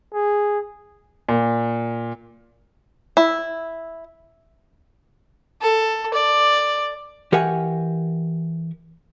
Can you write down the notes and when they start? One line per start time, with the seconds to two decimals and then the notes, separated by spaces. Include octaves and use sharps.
0.13 G#4
1.29 A#2
3.17 E4
5.62 A4
6.14 D5
7.32 E3 G4 A#4 C#5 F#5 G#5